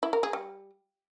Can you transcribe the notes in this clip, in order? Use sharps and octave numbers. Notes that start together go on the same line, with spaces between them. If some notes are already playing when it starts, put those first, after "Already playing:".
E4
A#4
G#4
G3